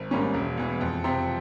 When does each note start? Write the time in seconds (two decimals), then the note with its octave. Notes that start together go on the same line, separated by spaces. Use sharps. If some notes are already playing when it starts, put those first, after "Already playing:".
Already playing: G#1
0.11 G#2 G3 A#3 C#4
0.34 E1
0.57 E2 E3
0.81 F2
1.04 C3 F3 C4